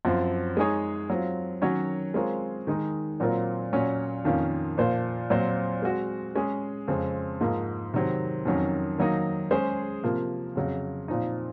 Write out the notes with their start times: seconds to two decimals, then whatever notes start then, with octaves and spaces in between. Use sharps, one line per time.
0.05 F#2 F3 C4
0.57 G#3 D#4 G#4 C#5
1.09 F#3 C4 F4
1.62 D#3 F#3 C#4 F#4 C#5
2.14 G#3 C4 F4 A#4 C#5
2.67 D#3 G#3 D#4
3.20 A#2 F#3 C4 F4 A#4
3.73 A#2 F#3 C#4
4.25 F2 D#3 A#3 C#4 F4
4.78 A#2 F3 A#3 F4 C5
5.30 A#2 F#3 C4 F4 C5
5.82 G#3 C4 F#4
6.35 G#3 C#4 G#4
6.88 F2 C#3 G#3 C4
7.41 G#2 F3 A#3 D#4
7.94 C3 D#3 F#3 C4
8.45 F2 D#3 F#3 C#4
8.98 D#3 F#3 A#3 D#4
9.51 G#3 C#4 G#4 C5
10.04 C3 F3 A#3
10.56 F2 C#3 F#3
11.08 A#2 F3 C4 D#4